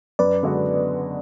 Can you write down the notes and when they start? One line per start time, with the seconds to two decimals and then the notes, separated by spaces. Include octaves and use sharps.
0.19 F#2 B4 D5
0.43 D3 G#3 B3 F#4